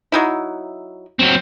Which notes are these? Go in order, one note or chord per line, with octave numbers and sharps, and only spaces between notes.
F#3 D#4 E4
F#3 C4